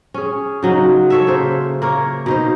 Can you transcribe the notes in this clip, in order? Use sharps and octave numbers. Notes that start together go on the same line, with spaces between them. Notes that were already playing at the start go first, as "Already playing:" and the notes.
C#4 G#4
C#3 F#3 D#4
A4 C#5 E5
C#3 A#3 C5
A#3 A#4 C#5
B2 D#4 C5